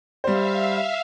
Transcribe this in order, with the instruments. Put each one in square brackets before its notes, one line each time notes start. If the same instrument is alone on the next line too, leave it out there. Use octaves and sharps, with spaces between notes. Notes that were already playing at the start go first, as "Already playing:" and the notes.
[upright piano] G3 C5 [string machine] E5 F5